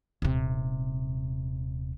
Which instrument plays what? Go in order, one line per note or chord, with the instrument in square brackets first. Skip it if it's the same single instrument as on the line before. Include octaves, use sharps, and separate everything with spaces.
[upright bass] D#1 C3